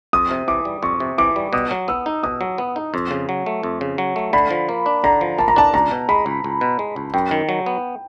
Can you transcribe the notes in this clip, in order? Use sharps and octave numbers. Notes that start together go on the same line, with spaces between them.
F2 D#6
C3
E3 D6
G3
F2 C#6
C3
E3 D6
G3
B2 D#6
F#3
B3 E6
D#4
B2 D#6
F#3
B3
D#4
F2
C#3
F#3
A3
F2
C#3
F#3
A3
D3 B5
F3
A#3
D4
D3 A#5
F3
A#3 A5
A#5
D4 A5
C#2 A#5
B2
G#3 B5
C#2
C#2
B2
G#3
C#2
F#2 G5
D#3
F#3
B3